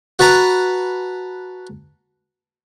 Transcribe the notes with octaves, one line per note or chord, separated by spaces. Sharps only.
F#4 B4 A5 A#5